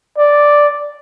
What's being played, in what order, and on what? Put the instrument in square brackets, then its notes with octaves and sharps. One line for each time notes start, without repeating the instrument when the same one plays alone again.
[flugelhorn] D5